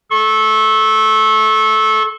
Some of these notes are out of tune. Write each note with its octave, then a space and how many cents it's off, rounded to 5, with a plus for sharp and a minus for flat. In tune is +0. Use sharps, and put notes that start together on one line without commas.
A4 -20 C#6 -30